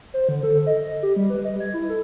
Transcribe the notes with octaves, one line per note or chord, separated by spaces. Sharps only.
C5
D3
A4
D#5
D#5
G4
G3
B4
D#5
G#6
E4
A4